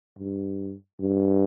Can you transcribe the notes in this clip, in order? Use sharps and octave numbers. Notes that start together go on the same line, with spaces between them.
G2
G2